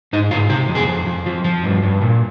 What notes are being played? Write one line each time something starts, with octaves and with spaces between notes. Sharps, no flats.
G#2 D#4
G#2 F4
C3 G4
F2
G#4
F2
F2
F3
F3
G2
G2
A#2